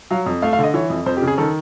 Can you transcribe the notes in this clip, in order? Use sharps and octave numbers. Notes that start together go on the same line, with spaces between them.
F#3 F5
F2
A3 F5
F5
D3 D#5
E3 C#5
F2
F2 C5
G4
C#3
G#4
D#3 A4